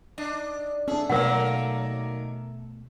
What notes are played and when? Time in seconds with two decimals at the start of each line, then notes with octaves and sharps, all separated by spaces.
0.18 D4 D#5
0.88 C#4 D4 G#4 A4 E5
1.10 B2 D#3 F#3 A3 A#3 A#4 F#5